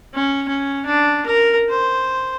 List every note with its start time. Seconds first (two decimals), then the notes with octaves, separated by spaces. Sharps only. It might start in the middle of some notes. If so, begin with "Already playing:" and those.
0.14 C#4
0.48 C#4
0.86 D4
1.26 A#4
1.69 C5